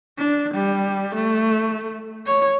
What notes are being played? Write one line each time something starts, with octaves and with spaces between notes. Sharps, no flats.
D4
G3
A3
C#5